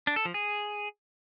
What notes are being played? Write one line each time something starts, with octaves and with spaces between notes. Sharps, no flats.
D4
A4
F3
G#4